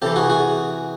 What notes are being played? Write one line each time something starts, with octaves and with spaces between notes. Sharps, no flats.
C3 E3 G4 A4
F#4 G#4
F#4 G#4